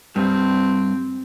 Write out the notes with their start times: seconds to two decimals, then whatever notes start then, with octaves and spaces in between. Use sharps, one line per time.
0.16 G2 C4